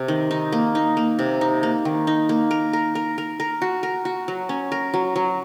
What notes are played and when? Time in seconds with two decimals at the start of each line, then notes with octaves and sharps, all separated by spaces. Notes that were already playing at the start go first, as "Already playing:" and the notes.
Already playing: C3
0.08 D#3
0.31 D#4
0.52 A#3
0.75 D#4
0.97 A#3
1.19 C3
1.41 D#4
1.63 A#3
1.85 D#3
2.07 D#4
2.29 A#3
2.51 A#4
2.73 A#4
2.95 A#4
3.18 A#4
3.40 A#4
3.62 F#4
3.83 A#4
4.05 F#4
4.28 F#3
4.49 C#4
4.72 A#4
4.94 F#3
5.16 F#3